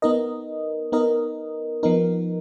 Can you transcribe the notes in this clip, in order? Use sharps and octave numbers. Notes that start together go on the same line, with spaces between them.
B3 D#4 A#4 D#5
B3 D#4 A#4 D#5
F3 B3 D#4 A#4